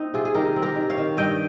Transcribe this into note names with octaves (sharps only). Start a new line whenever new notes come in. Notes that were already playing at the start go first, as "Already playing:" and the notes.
Already playing: A#3 C4 D#4
C3 F4 G#4
G#4
D#3 G4 A#4
C4
G4 A#4
D#3
C#5 F5
D#3
G2 D#5 G5